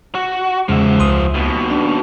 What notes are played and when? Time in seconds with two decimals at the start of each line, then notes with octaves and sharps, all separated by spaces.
0.15 F#4
0.69 E2 C#3 F3 G#3 E5
0.99 C#2 C6 D#6
1.34 D#2 B2
1.70 D4